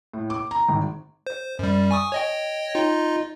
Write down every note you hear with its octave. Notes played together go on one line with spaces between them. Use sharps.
A2
D6
A#5
G#1
C5
F#2 G3
G#5 C#6 D#6
C#5 D#5 G5
D#4 F4 D#5